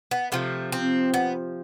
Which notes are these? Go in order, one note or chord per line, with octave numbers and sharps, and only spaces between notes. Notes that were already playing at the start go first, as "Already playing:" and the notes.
B3
C3 F3 A3 B3
C4
B3